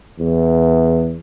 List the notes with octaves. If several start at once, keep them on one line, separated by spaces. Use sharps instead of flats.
E2